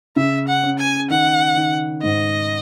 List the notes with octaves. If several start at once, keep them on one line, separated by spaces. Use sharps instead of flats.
C#3 E5
F#5
C#4
G#5
D#3 F#5
D#3
G#2 D#5